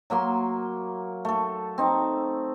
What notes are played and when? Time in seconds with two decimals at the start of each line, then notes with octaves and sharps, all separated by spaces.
0.10 F#3 A#3 E5 C6
1.25 A3 A4
1.78 C4 D#4